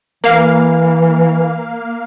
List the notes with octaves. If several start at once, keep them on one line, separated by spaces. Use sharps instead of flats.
E3 A#3 F5